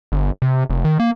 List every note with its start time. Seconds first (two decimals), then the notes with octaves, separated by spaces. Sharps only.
0.12 G1
0.42 C3
0.70 F1
0.85 D#3
1.00 A#3